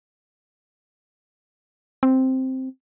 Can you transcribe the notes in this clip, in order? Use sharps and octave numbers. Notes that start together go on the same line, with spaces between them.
C4